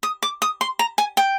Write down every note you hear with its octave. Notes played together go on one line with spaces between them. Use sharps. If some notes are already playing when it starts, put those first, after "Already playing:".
D#6
D6
D#6
C6
A#5
G#5
G5